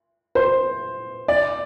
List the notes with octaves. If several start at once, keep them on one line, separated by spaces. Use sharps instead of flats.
C5
D5